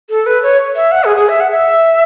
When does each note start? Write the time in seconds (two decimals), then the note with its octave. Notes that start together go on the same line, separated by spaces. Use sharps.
0.10 A4
0.26 B4
0.43 C#5
0.75 E5
0.92 F#5
1.04 G#4
1.17 G#4
1.29 E5
1.40 F#5
1.51 E5